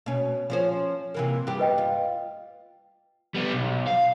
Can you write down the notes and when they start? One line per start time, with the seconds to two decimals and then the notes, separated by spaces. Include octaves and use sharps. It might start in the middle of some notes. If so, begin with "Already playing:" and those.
0.06 B2 C#4
0.50 F3 C#4 C5
1.14 C3 E3 A#3
1.47 G2 B3 G4
1.60 B4 D#5 G5
1.78 F4
3.35 G3 B3
3.53 B1
3.87 F5